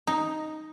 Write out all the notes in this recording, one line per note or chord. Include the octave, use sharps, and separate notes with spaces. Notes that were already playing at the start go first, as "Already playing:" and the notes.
D#4